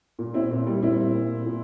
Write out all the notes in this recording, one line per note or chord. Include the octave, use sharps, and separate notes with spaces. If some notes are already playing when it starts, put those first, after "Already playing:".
A#2
C4 E4
A#2
G3
A#2 C4 E4
A#2
A#2